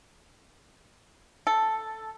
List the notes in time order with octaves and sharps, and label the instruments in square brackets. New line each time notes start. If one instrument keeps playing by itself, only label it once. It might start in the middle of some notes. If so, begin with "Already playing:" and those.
[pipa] A4